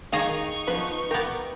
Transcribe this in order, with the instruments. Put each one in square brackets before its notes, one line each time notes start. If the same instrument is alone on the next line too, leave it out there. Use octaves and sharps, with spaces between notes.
[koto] D#3 G#4 A#5 [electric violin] D#4 C#6 [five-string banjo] F5
[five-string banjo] F3 B3 B4
[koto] B3 G4 [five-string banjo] A#4